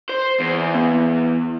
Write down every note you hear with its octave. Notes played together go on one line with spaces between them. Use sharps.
C5
E2
B3